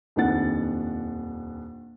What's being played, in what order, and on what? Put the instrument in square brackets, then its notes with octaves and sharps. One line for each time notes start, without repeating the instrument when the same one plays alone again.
[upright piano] D#1 F2 D#3 D4 F#5 A6